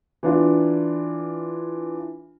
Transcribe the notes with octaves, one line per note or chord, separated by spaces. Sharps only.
E3 D4 F4